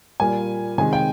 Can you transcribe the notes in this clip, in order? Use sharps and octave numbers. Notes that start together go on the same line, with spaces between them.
A#2 G3 A#3 G#5
C3 D#3 G#3 G#5
G5